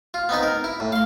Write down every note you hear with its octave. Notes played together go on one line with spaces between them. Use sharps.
F4
B3 C4 D#4 B4
A#4
E4
A2
F5 C6